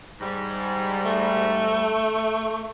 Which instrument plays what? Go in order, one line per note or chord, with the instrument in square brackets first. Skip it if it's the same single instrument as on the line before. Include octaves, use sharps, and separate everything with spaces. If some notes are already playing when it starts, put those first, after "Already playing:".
[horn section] G#2 G3
[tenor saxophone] A3